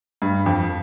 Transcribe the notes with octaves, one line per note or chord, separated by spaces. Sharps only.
G2
F2